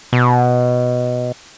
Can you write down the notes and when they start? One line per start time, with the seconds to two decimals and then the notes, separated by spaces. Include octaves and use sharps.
0.13 B2